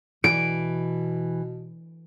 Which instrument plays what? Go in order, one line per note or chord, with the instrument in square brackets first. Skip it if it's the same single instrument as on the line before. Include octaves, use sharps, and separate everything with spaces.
[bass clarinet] B2 [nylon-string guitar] E3 [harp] D7